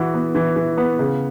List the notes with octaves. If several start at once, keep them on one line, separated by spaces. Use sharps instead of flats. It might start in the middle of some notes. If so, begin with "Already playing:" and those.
Already playing: E3 F#4
B3
E3
E3
B3
C#3